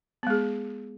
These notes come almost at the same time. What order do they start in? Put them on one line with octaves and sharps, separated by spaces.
B3 G#3 G#4